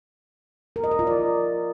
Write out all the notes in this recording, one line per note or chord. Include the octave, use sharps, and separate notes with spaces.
A#4
D#5
A#4
F4
D5